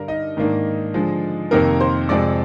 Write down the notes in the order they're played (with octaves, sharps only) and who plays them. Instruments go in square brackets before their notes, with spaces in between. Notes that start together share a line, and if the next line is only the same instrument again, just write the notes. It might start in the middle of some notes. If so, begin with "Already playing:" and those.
Already playing: [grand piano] G2 D3 G3 A#4 A#5
D#4 D#5
G#2 D#3 A#3 D4
D3 F3 G#3
F2 C3 D#3 A#3 A#4 A#5
C5 C6
F2 C3 F3 G#3 D5 D6